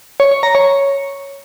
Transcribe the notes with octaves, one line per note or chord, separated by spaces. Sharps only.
C#5
C#5
A#5
C#5